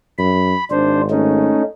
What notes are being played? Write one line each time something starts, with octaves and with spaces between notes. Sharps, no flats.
F#2 B5
G#1 D4 C5
A3 C#4 D#4